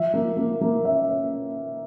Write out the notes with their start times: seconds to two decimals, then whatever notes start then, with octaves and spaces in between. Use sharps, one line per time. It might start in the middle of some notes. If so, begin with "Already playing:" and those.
Already playing: F3 E5
0.14 A#3
0.37 A#3
0.61 A#3
0.84 C#4 E5
1.08 C#4